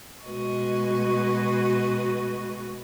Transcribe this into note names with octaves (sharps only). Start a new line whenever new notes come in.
B2 G#3 F#4 B4 D#5 C#6